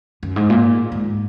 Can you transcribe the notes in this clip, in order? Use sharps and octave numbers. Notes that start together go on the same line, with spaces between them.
F#2
G#2
A#2
G#2